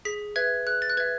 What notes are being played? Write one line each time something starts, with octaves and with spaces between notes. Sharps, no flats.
G#4 B6
B4 E5 G#6
G#4 F#6
A6
F#6
B4 E5 G#6